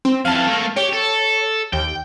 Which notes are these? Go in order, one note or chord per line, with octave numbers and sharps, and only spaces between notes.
C4
F2 E3 F5 A5
A3 A#3
G4 C#5
A4
D#2 G5